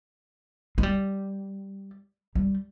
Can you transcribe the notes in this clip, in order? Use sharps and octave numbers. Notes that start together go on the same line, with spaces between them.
G#3
G3
G3